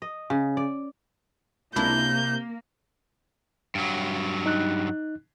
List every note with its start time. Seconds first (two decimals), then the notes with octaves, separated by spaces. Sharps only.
0.02 D#5
0.30 C#3
0.57 D5
1.76 C#2 C3 A#3 D4 E4 G6
3.75 G2 F#3
4.46 D#4 F#6